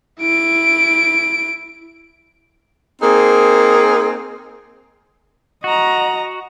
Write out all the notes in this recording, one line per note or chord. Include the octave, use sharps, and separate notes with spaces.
E4 D7
A#3 C4 D#4 G#4
F#4 D#5 A#5